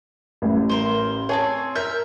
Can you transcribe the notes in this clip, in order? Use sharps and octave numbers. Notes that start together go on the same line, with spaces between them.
A1 A2
A#4 C5
C4 F4 G#4 C#5 A5
A#4 E5 G6